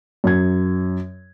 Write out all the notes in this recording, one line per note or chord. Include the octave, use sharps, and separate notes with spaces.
F#2 G#6